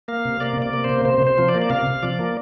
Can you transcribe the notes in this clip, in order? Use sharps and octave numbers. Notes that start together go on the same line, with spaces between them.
A#3 F5
C3
A#3 D5
C3
D5
A#3
C5
C3
C3 C5
C3 C5
F3
D5
A#3
D5
C3 F5
C3
F3 D5
A#3